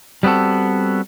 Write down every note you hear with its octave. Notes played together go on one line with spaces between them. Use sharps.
G3 B3 C4 F#4 A4